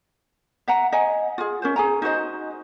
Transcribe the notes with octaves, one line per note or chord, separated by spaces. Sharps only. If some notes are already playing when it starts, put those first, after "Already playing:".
E5 F#5 A#5
D#5 F#5 G#5 A#5
F4 G#4
C#4 A#4 C5
G#4 G#5 A#5
D#4 F#4 C5 D#5